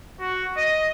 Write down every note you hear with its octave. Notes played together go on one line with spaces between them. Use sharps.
F#4
D#5